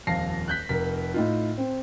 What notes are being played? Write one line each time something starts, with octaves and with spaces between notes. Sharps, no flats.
D#1 F2 F5 A5 A#6 C7
F#6 G6 B6
F1 A#4 B6
A2 D#4 F4
C4